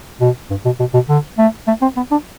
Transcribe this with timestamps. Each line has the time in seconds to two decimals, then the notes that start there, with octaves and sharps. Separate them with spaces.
0.21 B2
0.50 G2
0.65 B2
0.79 B2
0.94 B2
1.09 D3
1.38 A3
1.68 A3
1.82 C4
1.96 B3
2.11 D4